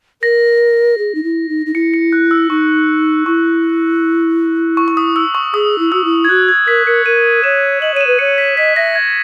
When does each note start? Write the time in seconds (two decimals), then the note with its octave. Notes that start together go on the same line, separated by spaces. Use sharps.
0.22 A#4 A#6
0.98 G#4
1.15 D#4
1.23 E4
1.49 D#4
1.66 D#4
1.74 E4 C#7
1.94 C#7
2.13 F#6
2.31 E6
2.50 D#4 C#6
3.26 E4 C#6
4.77 C#6
4.88 C#6
4.97 D#6
5.16 E6
5.35 C#6
5.54 G#4 D#6
5.79 E4
5.92 F#4 E6
6.04 E4
6.25 G#6
6.29 F#4 F#6
6.48 G#6
6.67 A#4 B6
6.86 A#4 C#7
7.06 A#4 D#7
7.44 C#5 E7
7.81 D#5 F#7
7.94 C#5 D#7
8.01 E7
8.07 B4
8.19 C#5 C#7
8.38 B6
8.57 D#5 B6
8.76 E5 A#6
8.95 G#6